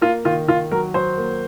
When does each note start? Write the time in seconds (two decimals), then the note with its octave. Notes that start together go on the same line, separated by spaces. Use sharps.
0.01 A#3 F4
0.25 D#3 F4
0.48 D#3 F4
0.71 F#3 A#4
0.94 F#3 C5
1.18 A#3